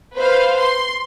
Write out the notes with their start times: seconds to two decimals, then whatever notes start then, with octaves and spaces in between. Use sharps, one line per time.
0.16 B4 C5 F5
0.59 C6